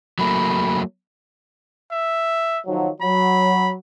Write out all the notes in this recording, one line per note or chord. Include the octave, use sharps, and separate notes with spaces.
F#3 A3 A#3 B5
E5
D#3 F3 F#3
F#3 B5